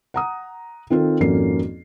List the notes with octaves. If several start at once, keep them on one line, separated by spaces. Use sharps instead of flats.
F#5 A#5 D#6
D#3 C4 F4 A4
G#1 F2 A#3 C#4 F#4 C7